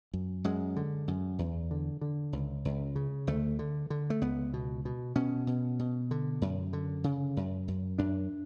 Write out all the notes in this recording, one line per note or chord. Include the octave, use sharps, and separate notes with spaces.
F#2
F#2 G#3
D3
F#2
E2
D3
D3
C#2
C#2
C#3
D2 A3
D3
D3
A3
C#2 B3
B2
B2
B2 C#4
B2
B2
D3
F#2
D3
C#3
F#2
F#2
F#2 D4